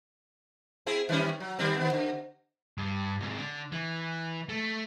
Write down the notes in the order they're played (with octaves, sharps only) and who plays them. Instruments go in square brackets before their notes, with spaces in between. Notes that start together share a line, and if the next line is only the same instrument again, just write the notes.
[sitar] C4 E4 G#4
D#3 G3 C#4
F#3
D#3 G3 C4
D#3 B3
D3
[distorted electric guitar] G2
G#2 C3
D3
E3
A3